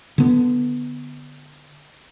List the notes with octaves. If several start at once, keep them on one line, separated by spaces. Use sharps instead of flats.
D3 B3